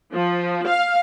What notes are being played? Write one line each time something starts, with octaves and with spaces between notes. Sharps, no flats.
F3
F5